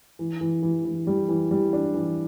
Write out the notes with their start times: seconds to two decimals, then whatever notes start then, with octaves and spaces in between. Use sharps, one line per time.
0.19 E3
0.41 E3
0.63 E3
0.85 E3
1.07 G3
1.29 E3
1.51 G3
1.73 D4
1.94 E3